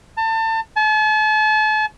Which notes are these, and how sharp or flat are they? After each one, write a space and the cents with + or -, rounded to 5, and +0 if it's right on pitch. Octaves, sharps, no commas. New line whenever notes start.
A5 +30
A5 -40